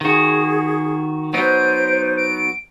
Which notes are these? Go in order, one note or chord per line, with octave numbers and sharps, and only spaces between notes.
D#3 F#4 G#4
F#3 B3 D#4 C5 D7
D7